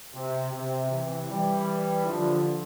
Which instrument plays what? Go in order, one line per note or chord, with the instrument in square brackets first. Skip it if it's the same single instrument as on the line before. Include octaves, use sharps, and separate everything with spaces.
[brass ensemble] C3
C3
C3 E3
E3 G3
D3 F3